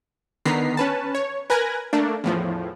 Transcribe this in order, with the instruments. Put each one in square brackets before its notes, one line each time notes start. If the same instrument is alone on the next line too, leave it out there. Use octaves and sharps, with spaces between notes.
[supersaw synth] D3 D#3 B3 A#5 B6 C7
C#4 B4 A5
C#5
A#4 B4 G#5 F#6 G#6 A#6
A3 A#3 D4
E2 A2 F3